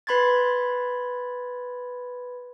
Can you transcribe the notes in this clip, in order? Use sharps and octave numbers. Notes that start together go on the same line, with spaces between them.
B4 B5 C6 G#6 A6